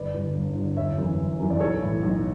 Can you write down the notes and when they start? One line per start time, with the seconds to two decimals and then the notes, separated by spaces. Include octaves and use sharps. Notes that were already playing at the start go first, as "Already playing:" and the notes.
Already playing: G1 B4 D5
0.14 G2 D3
0.35 G1
0.55 G2 D3
0.76 G1 C#5 E5
0.97 F#2 E3
1.18 G1
1.39 F#2 E3
1.50 D5
1.60 B1 A4 C#5
1.81 A2 E3
2.03 B1